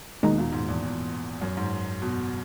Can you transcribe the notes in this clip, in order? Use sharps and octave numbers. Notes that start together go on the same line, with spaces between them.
D#2 B2 D#3 G#3 D#4
A#2
G#2
E2
E2
F#2
G#2
B2